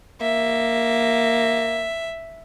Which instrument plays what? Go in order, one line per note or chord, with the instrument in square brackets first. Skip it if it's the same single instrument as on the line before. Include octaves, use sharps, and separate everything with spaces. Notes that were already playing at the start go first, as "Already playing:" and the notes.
[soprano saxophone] A#3 [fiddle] E5